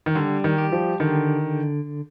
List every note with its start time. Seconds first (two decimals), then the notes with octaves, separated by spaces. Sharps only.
0.06 D#3
0.15 D3 G3
0.44 D#3
0.58 G4
0.72 F3
1.00 D3 D#3